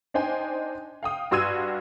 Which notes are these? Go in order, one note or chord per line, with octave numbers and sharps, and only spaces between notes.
D4 D#4 C5 G5 G#5
F5 G5 D#6
G2 F#4 C6 E6 G#6 D#7